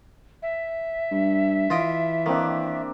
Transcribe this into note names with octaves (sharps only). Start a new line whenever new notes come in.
E5
G2
E3 F4 D#5 G5
D#3 A#3 C4 D4